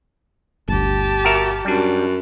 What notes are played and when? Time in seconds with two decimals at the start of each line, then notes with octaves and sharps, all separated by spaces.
0.68 G1 D2 G4 A5
1.25 F#4 A#4 E5
1.65 F#2 G3 D4